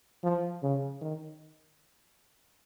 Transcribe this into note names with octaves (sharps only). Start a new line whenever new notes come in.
F3
C#3
D#3